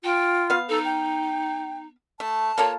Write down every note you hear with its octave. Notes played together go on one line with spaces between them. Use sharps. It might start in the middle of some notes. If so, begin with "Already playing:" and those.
F4 G5
B3 F5
D#4 A4
G5
A3 A5
A#3 F4 A4 C#5